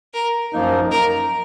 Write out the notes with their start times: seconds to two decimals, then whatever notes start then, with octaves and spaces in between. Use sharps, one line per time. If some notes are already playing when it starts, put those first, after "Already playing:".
0.14 A#4
0.53 F#2 F3 A#3 D#4
0.91 A#4